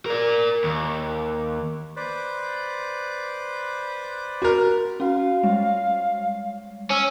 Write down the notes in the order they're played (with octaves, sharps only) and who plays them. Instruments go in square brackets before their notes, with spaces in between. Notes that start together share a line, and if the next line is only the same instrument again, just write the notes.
[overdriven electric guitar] A#4 D5
D#2
[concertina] B4 C5 D5
[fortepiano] F#4 A#4
[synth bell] C#4 F#4 [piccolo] F5
[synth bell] G3 G#3
[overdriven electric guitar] C#4 [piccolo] E6